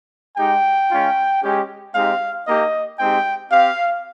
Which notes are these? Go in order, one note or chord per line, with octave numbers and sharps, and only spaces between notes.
G#3 D#4 G4 G5
G#3 C#4 F4
G#3 C#4 G4
G#3 C4 D#4 G4 F5
A#3 D#4 G4 D#5
G#3 C4 D#4 G4 G5
C4 G4 F5